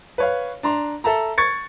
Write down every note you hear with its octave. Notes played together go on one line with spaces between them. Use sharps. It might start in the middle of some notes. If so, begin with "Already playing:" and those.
B4 C#5 F5
D4 A#5 C6
A4 E5 A5 A#5
C#6 G#6 A6 C#7